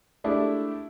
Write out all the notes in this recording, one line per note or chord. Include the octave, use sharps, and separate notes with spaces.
G#3 A3 D4 E4 G4 E5